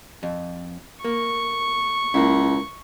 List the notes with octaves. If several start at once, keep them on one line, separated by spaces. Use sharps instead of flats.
F2
A#3 C#6
C#2 A#3 E4